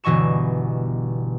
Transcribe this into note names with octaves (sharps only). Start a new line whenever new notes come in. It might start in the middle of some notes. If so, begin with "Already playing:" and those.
G1 B2 E3 D#5 C#6 E7